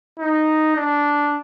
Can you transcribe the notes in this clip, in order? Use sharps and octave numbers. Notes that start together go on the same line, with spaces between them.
D#4
D4